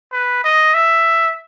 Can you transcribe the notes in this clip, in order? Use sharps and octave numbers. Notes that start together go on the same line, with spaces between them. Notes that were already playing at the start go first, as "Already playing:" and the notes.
B4
D#5
E5